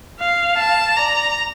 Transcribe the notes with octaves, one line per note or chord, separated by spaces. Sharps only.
F5
A5
D5 A#5